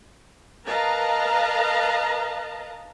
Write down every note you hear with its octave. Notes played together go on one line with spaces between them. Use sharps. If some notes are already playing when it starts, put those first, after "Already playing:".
A#4 B4 D#5 F5 A5 A#5